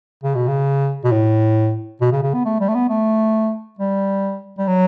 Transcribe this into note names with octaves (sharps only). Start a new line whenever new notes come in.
C#3
B2
C#3
B2
A2
B2
C#3
C#3
B3
A3
G3
A3
B3
A3
G3
G3
F#3